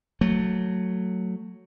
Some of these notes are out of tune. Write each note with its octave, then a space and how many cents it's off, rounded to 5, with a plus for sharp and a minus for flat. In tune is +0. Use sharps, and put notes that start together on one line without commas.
F#3 +0 A3 +15